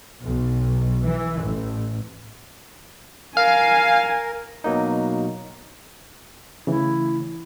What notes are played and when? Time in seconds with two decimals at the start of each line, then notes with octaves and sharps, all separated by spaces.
0.23 B1
1.05 E3
1.40 A1
3.37 A#4 F5 G#5
4.64 B2 F#3 A#3 D#4
6.67 C#3 E3 A3 E4